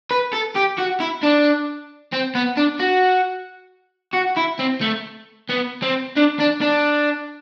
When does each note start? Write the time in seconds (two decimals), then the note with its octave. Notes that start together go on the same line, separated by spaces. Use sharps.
0.11 B4
0.33 A4
0.55 G4
0.78 F#4
1.00 E4
1.23 D4
2.12 C4
2.35 B3
2.57 D4
2.80 F#4
4.14 F#4
4.37 E4
4.59 C4
4.82 A3
5.49 B3
5.82 C4
6.16 D4
6.39 D4
6.61 D4